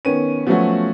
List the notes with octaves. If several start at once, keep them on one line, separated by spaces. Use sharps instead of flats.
D#3 B3 C#4 D#7
F3 F#3 A3 B3 C#4 F#4